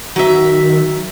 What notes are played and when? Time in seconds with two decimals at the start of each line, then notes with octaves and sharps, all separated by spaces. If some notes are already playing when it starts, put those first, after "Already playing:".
0.16 D#3 F#3 E5